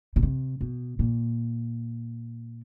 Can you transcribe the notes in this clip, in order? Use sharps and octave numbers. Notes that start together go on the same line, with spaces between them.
B2
C3
B2
A#2